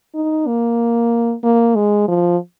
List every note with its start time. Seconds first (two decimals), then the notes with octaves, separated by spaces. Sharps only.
0.15 D#4
0.47 A#3
1.44 A#3
1.76 G#3
2.08 F3